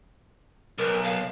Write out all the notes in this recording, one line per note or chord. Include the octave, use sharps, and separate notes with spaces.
B1 A#4
F5